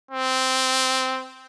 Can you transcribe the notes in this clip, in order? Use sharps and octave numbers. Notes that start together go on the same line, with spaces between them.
C4